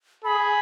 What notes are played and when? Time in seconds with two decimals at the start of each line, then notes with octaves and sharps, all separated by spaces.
0.24 G#4 B5